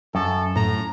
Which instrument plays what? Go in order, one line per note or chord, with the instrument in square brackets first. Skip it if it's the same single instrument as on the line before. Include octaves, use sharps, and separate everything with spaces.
[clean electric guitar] F#2 [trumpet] A4
[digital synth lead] A2 [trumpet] A#5